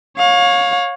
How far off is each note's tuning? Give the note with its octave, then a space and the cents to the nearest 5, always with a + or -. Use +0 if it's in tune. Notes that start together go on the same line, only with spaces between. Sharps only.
C#5 -5 F5 +30